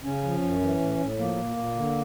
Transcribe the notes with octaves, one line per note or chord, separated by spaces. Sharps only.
C#3 C#4
F3
F#2
E3
A2
A2
F3 A#3
A#2
A#2
D3